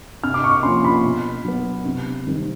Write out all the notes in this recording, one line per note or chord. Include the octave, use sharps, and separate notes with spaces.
C3 F6
D6
C#6
F3 A#3 C#4 C6
B5
B2
F#3 B3
C3
D#3 G3 C4